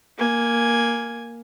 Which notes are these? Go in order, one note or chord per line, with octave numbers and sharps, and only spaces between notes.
A#3 G#5